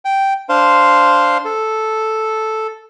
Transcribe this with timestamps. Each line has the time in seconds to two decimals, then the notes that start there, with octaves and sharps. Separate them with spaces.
0.05 G5
0.49 D4 C5 F5 C6
1.45 A4